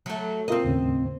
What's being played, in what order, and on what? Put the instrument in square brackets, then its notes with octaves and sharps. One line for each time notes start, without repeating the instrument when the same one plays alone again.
[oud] F#3 A3
[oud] C4 D#5 [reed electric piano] F4 A#4
[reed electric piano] D#2 A2 C#3